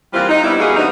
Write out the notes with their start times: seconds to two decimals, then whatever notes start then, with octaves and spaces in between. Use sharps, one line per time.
0.13 E3 G3 A#3 C4 F4
0.29 D#4
0.44 G3 B3 D4 E4
0.60 G3 A#3 B3 F#4 G#4
0.76 E3 F#3 B3 C4 D4 D#4